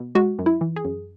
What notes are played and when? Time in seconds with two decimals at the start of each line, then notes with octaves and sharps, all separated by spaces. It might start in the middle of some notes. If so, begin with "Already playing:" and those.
Already playing: B2
0.15 G#3 F#4
0.39 F#2
0.46 E4
0.61 E3
0.76 G#4
0.85 F#2